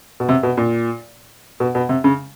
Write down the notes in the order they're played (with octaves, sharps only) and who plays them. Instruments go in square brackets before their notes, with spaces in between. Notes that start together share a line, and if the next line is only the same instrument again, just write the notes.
[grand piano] B2
C3
B2
A#2
B2
B2
C3
C#3